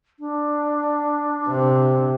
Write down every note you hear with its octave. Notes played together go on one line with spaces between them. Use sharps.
D4
C3